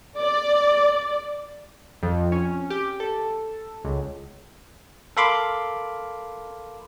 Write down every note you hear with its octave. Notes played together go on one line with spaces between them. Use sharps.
D5
F2
C#4
G4
A4
C#2
A4 A#4 F5 B5 C6 D6